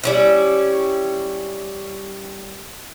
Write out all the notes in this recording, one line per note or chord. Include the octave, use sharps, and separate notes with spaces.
G3 C#4 E4